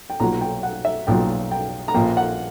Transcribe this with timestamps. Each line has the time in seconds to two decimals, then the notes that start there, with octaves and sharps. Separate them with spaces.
0.10 G5
0.20 B1 A#2 F#3 A#5
0.41 G5
0.63 F#5
0.85 E5
1.07 B1 A#2 F#3 G5
1.51 G5
1.88 A#5
1.94 A#1 A#2 A#3 G5
2.17 F#5